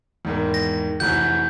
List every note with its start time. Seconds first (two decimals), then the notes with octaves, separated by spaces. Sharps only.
0.25 E2 G#2 D#3
0.54 A#6
1.00 F1 E3 F#4 G6